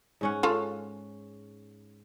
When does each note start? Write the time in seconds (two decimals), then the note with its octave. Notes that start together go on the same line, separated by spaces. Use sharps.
0.21 G#2 C#4 F#5
0.43 F4 A4 C#5